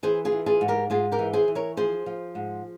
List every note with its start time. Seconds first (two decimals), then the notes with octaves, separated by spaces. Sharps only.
0.03 E3 G#4 C5
0.25 F4 G#4
0.32 E3
0.46 F4 G#4
0.61 G#2
0.68 G4 A#4
0.90 G#2 F4 G#4
1.12 G4 A#4
1.19 E3
1.33 G#4 C5
1.48 E3
1.55 A#4 C#5
1.77 F3 G#4 C5
2.06 F3
2.35 G#2